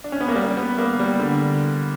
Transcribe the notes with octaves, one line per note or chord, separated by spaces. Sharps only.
D4
C#4
B3
A#3
G3
B3
A#3
G3
D3